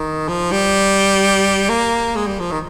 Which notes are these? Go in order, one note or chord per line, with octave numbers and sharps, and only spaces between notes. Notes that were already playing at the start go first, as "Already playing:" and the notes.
Already playing: D#3
F3
G3
A#3
G#3
G3
F3
D#3